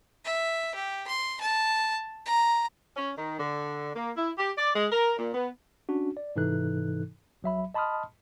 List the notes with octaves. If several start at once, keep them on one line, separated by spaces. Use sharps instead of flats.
E5
G4
C6
A5
A#5
C#4
D#3
D3
A#3
E4
G4
D5
G#3
A#4
A#2
B3
C#4 D4 F#4
D5
G#2 C3 E3 D#4 A4 F#6
A#1 F#3 E5 B5
D#5 A5 B5 C6 D#6 F6